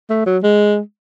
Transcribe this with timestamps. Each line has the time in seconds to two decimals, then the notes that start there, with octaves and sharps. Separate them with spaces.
0.10 A3
0.26 F#3
0.43 G#3